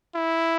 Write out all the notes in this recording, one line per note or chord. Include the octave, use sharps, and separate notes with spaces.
E4